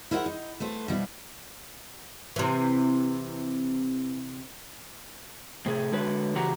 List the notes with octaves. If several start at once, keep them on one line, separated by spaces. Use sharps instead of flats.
E4 A#4 C5 D#5 F#5
D#4
A3 B4 C5
B2 F3 G3 E4
C3 E3
A2 C3 G#4
D3 G#3 F#4 B4 C#5
C#3 E3 F#4 G4 F#5 A#5